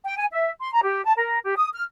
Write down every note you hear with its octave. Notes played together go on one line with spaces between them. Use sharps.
G5
G#5
E5
C6
A#5
G4
A5
A#4
G4
D#6
F6